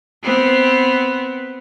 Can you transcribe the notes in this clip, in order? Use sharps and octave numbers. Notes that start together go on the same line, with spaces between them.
B3 C4